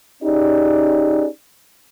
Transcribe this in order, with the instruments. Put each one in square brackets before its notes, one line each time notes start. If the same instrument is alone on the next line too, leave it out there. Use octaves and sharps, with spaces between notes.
[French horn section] C#4 D#4 G4 G#4 D5